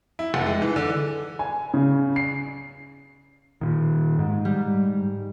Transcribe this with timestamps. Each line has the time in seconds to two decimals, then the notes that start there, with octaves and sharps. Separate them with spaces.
0.19 E4
0.34 F1
0.47 G#3
0.62 E3
0.76 D3
1.39 G#5
1.74 C#3
2.16 C7
3.61 A#2 D#3
4.19 G#2
4.45 G3